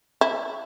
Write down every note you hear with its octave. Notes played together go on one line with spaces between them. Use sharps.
E4